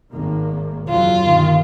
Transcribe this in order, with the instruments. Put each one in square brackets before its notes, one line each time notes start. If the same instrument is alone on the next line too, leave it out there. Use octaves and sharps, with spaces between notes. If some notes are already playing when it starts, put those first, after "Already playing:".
[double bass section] G#1 D#3 A#3
[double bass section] F#1 E2 F#3 [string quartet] F4
[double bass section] G1 B2 D#3